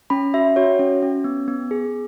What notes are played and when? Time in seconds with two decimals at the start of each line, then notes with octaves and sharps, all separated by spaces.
0.10 C#4 B5
0.34 F#4 E5
0.56 F#4 C#5
0.79 C#4
1.02 C#4
1.24 B3
1.48 B3
1.71 G#4